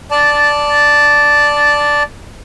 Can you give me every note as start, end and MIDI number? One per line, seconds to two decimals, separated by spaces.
0.11 2.03 74
0.11 2.03 81